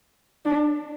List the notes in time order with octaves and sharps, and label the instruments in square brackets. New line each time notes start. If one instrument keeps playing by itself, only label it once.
[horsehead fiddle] D4